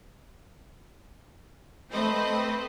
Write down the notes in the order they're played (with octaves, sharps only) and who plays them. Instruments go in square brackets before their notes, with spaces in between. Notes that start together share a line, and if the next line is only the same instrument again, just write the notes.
[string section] A3 C4 B4 C5 D#5